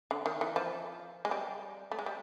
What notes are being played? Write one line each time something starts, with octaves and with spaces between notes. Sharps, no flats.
D3
D#3
E3
F3
G#3
G3
A3
G#3
G3